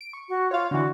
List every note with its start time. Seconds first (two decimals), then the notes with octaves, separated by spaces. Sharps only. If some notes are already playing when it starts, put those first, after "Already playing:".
0.01 D7
0.13 C#6
0.29 F#4
0.51 F4 C#5 F5
0.71 D3 E3 F#4